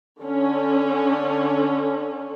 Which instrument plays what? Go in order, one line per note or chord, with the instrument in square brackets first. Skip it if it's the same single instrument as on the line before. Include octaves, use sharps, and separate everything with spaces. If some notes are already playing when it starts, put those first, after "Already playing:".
[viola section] D3 C#4